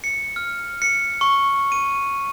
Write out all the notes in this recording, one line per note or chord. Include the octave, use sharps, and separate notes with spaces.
C#7
F6
C#7
C#6
D#7